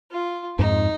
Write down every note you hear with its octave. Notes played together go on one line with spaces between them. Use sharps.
F4
F2 G#2 D#4